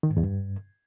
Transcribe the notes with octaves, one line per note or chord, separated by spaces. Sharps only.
D#3
G#2
E2
G2